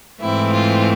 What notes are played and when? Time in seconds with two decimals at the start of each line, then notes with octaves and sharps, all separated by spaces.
0.20 G#2 E3 A3 C4 E4
0.53 F4